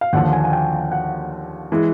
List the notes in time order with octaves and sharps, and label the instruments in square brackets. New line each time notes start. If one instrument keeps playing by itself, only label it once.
[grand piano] F5
D#2 D3 F3 F#5
G#5
G#5
G5
F#5
E3 G#3